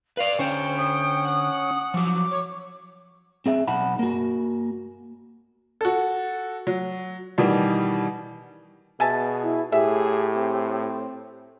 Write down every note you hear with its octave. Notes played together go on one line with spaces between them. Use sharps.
B4 D5 F5
D3 C#4 C5 G5
D#6
F#5
F3 F#3 D6
C#5
C4 G#4 E5
B1 D#4 F#5 A5 B5
A#3 F#4
F#4 A4
F#3
B2 D#3 E3 G3
B2 G#4 E5 G#5 A5
E4
A2 G4 G#4 E5
C4